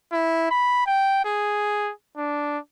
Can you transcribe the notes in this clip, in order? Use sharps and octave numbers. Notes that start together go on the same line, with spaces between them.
E4
B5
G5
G#4
D4